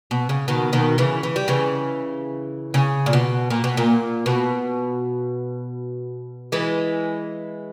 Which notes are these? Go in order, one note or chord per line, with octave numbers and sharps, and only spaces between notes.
B2
C#3
B2 D#3
B2 D#3
C#3 E3
E3
G3
C#3 E3
C#3
A#2
B2
A#2
B2
A#2
B2
E3 G#3